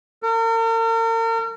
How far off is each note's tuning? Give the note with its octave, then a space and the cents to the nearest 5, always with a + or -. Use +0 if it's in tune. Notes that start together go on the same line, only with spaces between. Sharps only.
A#4 -40